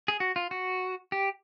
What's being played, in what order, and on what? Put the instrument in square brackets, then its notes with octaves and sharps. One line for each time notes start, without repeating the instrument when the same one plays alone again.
[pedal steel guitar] G#4
F#4
F4
F#4
G4